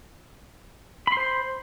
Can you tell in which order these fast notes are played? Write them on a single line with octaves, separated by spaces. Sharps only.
B5 C6 C5